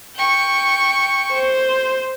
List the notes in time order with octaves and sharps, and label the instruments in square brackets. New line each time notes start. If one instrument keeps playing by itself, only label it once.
[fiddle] G5 C#6
[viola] C5